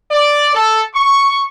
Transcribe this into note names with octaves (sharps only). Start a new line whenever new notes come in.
D5
A4
C#6